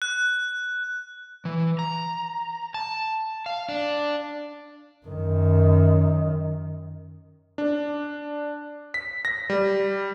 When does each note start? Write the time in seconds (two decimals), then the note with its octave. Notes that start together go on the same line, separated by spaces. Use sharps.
0.02 F#6
1.45 E3
1.79 A#5
2.74 A5
3.46 F5
3.69 D4
5.06 F#2 D#3
7.58 D4
8.94 B6
9.25 A#6
9.50 G3